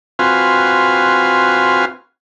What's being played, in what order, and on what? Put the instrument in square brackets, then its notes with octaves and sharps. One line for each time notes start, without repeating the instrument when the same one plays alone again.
[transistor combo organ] C4 F4 F#4 B4 F5 G#5